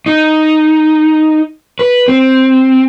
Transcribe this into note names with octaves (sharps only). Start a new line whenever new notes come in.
D#4
B4
C4